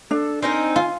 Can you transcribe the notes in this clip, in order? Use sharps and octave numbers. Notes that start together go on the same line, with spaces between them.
D4 A4
C4 D#4 A#4 G#5
F4